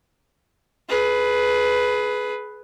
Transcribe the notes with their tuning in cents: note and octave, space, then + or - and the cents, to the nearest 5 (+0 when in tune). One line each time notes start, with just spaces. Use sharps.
G#4 +25 B4 +0